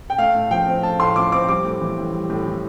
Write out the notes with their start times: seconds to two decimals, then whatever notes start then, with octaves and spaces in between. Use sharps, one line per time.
0.10 G5
0.18 A3 F5
0.34 A2
0.51 F3 G5
0.67 C4
0.83 A3 A5
0.99 A2 C6
1.16 F3 D6
1.32 C4 D6
1.48 G3 D6
1.64 A2
1.81 E3
1.97 A2
2.14 G3
2.30 A2
2.46 E3